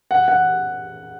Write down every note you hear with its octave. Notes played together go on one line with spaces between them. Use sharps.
F#5
F#5